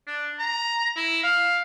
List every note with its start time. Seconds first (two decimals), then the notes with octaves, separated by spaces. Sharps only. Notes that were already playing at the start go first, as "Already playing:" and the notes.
0.07 D4
0.39 A#5
0.96 E4
1.23 F5